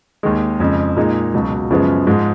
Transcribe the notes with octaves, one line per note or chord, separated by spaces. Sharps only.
D#2 D#3 G#3
F2 C#3 G#3
A#2 G#3 D#4
C#2 B2 F#3
F#2 C#3 F3 G#3 B3
G#2 F3 G#3